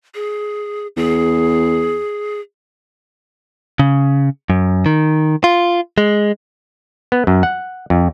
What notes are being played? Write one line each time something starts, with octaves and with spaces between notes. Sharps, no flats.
G#4
E2 G#4
C#3
F#2
D#3
F4
G#3
B3
F#2
F#5
F2